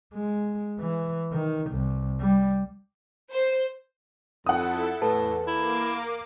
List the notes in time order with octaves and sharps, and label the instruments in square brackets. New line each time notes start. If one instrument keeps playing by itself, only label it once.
[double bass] G#3
E3
D#3
C2
G3
[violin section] C5
[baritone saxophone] F2 [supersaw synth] E4 A4 [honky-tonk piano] F#5 D#6
[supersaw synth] E2 [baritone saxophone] A2 [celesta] A4 B4 A5
[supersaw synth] A#3 D6 [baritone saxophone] E4